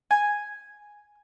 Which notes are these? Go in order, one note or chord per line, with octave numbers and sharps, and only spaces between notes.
G#5